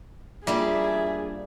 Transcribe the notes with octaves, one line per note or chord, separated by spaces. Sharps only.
F3 G3 A#3 D4 G#4 E5